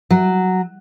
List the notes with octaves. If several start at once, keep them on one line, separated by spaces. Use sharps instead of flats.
F#3